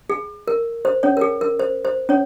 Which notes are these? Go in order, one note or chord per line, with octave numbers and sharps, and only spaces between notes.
G#4
A#4
C5
C#4 C#5
A#4
G#4
A#4
C5
C5
C#4 C#5